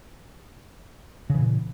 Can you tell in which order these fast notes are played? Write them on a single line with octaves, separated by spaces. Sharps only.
C#3 E3 A#2